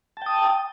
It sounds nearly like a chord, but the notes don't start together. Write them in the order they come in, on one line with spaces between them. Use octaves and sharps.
A5 G5 D#6